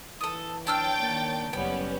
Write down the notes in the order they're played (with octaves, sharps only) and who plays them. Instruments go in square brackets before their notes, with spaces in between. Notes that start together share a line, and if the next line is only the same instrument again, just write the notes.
[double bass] E3 [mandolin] A4 D#6
[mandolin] D4 E6 F6 [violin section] C#5 G5 A6
[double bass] D#3 A#3
[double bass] F#1 G3 [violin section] B3 C#4 [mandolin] G5